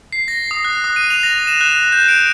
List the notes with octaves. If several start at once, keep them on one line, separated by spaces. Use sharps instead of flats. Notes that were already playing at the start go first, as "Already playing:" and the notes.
C7
A#6
D#6
F#6
D#6
D#7
F7
A#6
E7
F#6
G6
D7